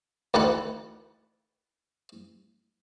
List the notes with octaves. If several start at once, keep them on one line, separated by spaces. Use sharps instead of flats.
D2 D#3 E3 A4 F#5 B5